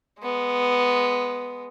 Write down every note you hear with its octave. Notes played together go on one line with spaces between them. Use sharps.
G#3 B3